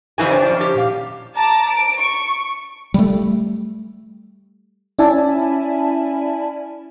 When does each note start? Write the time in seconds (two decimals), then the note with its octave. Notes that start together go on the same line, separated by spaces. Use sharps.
0.18 F2 E3 G4 C5 C#5 G#5
0.31 D4
0.45 D#3 F3 C#4
0.61 G4
0.74 A#2 F5
1.35 A5 A#5 D6
1.69 D7
1.99 C#6
2.94 G3 A3
4.99 C#4 E4 D5 E5 G#5 A5